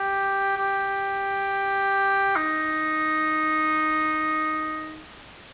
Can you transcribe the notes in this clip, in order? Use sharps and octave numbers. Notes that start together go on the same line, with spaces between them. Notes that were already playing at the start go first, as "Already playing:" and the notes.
Already playing: G4
G4
D#4